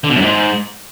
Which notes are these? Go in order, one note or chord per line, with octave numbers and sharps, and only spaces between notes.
D3
B2
F#2
G#2